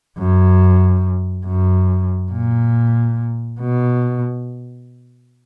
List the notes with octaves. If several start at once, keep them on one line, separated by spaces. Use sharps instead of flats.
F#2
F#2
A#2
B2